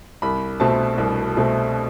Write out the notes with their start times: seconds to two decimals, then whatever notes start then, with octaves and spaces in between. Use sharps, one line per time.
0.22 C2 B5
0.60 B2 A3 C4 A5
0.98 C2
1.37 B2 A3 C4